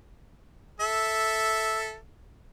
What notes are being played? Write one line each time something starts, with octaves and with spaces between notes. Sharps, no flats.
A4 E5